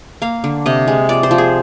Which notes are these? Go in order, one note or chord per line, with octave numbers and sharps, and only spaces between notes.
A#3 F5
D3
C3 D#5
G#3
F3 D5
C5
F3
G#4